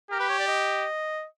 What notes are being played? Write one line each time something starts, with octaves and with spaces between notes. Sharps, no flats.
G4 A#4
B4
C#5
D5
D#5